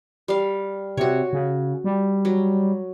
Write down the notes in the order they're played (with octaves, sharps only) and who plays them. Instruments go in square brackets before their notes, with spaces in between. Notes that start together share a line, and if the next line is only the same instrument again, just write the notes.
[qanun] G3 F5
[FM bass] C3 [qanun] F#4 C#5
[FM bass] C#3
G3
[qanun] F#3